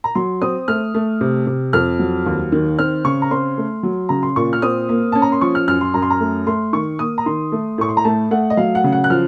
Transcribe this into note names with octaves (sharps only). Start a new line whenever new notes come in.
A#5
F#3 C6
C4 D#6
A3 F6
A3
C3
C3
F2 F6
F#3
D#2
D#3
C4 F6
C#3 C#6
A#5
C4 C6
A3
F#3
C#3 A#5
C6
A#2 C#6
F6
C4 D#6
A#3
C#4 A5
A#5
C6
F3 C#6
F6
F#2 F6
C6
F#2 A#5
C6
A#5
A3
A3 C6
D#3 C#6
A#3 D#6
A#5
D#3 C6
A3
A2 C#6
C6
A#5
A3 A5
A3 F#5
D#5
F#3 F5
F#5
C#3
F#5
F#6
F3 F6